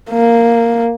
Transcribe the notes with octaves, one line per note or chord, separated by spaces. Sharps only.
A#3